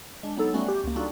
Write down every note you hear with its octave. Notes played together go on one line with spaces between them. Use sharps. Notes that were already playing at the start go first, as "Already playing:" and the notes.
G#3 D4
F#3 B3 D#4 A4
G3 A3 B3 C#4 F#4
G4
C#2 A#3
G3 D4 D#4 F4 F#4 A4